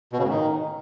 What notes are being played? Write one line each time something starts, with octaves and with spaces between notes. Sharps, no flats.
B2
C#3
A2
D#3